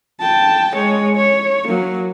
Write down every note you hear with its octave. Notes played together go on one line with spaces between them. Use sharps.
G5 A5
G#3 C#5
C#5
F#3 A#3